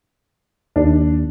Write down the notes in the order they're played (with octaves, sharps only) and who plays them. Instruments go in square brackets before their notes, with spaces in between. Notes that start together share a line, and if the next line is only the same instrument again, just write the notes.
[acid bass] D#2 [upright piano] D4